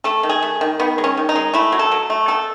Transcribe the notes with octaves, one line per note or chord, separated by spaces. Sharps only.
A3 A4
D#3
G#4
A3
D#3
D#3 B3
G#3
C#4
D#3
D#4
G#3
A3 E4
F#3
A4
F#3
A3
B2 A4